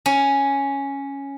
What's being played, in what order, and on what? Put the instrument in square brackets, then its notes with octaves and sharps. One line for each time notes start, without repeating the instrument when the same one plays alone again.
[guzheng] C#4